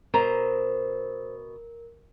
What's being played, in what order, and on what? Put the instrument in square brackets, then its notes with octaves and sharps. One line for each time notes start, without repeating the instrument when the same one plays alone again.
[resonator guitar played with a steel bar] B2 A#5 [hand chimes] A#4 [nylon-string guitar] C5